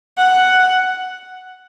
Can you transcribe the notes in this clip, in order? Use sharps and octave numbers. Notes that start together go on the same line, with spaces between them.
F#5